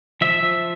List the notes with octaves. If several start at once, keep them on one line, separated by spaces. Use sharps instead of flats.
F3 E5
F3